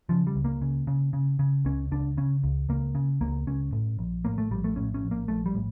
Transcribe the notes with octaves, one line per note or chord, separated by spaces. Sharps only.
C#3 F3
G3
C#2
A#3
C#3
C#3
C#3
C#3
C#2 C#4
C#2 D4
C#3 C#4
C#2
C#2 A#3
C#3
C#2 A#3
C#2 C#4
A2
A#1
A2 A#3
A3
A#1 G3
A3
A2 C#4
C#4
A#1
A#3
A#1 A3
G3
A2